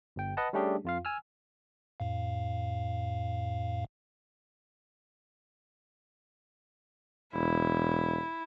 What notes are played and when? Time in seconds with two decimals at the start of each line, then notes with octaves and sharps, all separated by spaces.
0.16 G1 G5
0.37 B4 D#5 F#5 A5
0.53 G3 A3 C#4 D4 G4 G#4
0.85 F2 F4 F5
1.05 G#5 E6 F6
2.00 F2 A2 F5
7.33 E1 E4